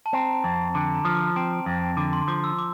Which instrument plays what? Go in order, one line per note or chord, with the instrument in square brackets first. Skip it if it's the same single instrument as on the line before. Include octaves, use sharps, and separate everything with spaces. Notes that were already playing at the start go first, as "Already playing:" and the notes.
[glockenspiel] A5
[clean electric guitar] C4 [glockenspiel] A#5
[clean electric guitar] F2
[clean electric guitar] D3 [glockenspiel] A5
[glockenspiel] A#5
[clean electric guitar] F3
[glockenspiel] D6
[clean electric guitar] C4 [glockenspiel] D6
[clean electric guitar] F2
[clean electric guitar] D3 [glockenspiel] D6
[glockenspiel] C6
[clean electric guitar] F3 [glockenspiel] D6
[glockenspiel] E6
D6